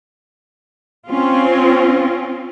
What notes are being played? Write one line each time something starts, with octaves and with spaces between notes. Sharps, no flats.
C4 C#4 F4